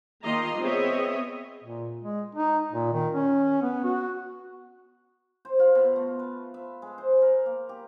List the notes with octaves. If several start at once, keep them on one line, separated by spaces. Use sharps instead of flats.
D#3 A#3 F4 D#5 A#5 C6
B3 C4 G#4 C#5 D#5 E5
A#2
G#3
D#4
A#2
D#3
C#4
B3
F#4
C5
F4
B2
A3
B4
E5
G#3
C5
A#4
A#3
G4